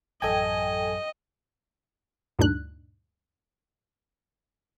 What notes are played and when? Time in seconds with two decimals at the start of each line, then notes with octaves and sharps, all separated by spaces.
0.22 A1 F#2 A4 D#5 G5 G#5
2.39 D2 G2 A#2 D4 D#4 F#6